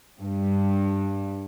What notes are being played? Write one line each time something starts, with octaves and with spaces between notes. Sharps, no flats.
G2